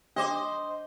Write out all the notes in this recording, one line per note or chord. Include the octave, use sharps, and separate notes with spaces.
D4 C5 D#5 D6